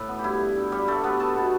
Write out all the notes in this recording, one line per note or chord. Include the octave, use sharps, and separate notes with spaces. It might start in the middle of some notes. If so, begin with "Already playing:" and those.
Already playing: A2 B4 E5
B3
G4
G2 E4
G2
G2
G2 G3 G4
G2 A3 A4
A3 B3 B4
A3 A4 A5
B2